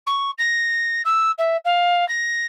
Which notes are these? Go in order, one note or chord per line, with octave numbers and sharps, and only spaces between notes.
C#6
A#6
E6
E5
F5
A#6